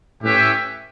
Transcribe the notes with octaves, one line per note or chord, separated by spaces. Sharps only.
A2 C#4 G4 B4 E5 G5